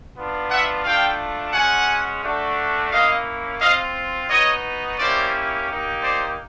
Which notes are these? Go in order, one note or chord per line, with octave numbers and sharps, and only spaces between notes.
B3 D4 F4
E5 F#5
A3 D4 F4 F5 G5
G#3 C#4 F#4 F#5 G#5
A3 D4 F#4
A#3 C#4 E4 D#5 F5
C4 F4 D#5 F5
B3 D#4 F#4 C#5 D#5
A#3 C#4 E4 G4 C5 D5
A#3 D#4 G4
C5 D5